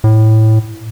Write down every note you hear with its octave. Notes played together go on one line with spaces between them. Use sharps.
A2